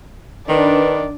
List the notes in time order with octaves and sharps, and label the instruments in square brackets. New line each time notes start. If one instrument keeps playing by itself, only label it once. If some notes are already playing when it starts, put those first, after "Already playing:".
[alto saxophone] D#3 [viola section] D4 [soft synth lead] B4 [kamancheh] D5